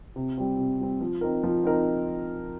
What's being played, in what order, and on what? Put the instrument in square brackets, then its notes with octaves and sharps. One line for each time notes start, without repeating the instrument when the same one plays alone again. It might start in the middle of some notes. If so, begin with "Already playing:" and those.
[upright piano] C3
G3 C4
C3
G3 C4
F3
C4 D#4 A#4
F3
C4 D#4 A#4